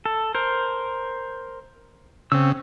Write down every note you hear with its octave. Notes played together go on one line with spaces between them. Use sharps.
A4
A#4 C5
C#3 C4 E6